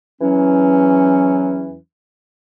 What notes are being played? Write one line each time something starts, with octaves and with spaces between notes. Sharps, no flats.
E2 E3 F#3 C#4